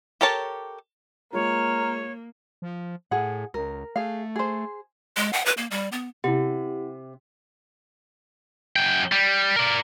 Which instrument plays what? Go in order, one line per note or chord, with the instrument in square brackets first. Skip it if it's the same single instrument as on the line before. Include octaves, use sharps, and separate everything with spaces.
[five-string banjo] G4 A4 A#4 C#5 A5
[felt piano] G#3 F4 [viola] A#3 [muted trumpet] A#4 [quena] C#5
[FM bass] F3
[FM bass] A2 [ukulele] G#4 F#5
[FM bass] C#2 [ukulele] A#4
[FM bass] A3 [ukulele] G#4 F5
[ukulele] G#4 C5
[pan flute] G#3
F#5
B4
A#3
G3
B3
[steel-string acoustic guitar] C3 [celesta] E4 F#5 [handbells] G4
[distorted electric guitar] F#2 G5
G3
A#4 D5